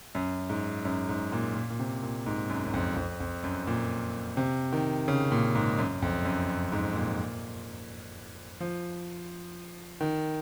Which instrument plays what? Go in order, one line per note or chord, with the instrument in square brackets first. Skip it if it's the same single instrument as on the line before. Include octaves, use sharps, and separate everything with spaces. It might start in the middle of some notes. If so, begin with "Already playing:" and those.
[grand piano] F#2
G#2
F#2
G#2
A#2
A#2
A#2
C3
A#2
G#2
F#2
F#2
F2
F2
F2
F#2
A#2
C3
D#3
C#3
A#2
G#2
F#2
F2
F#2
F#2
G#2
A#2
F3
D#3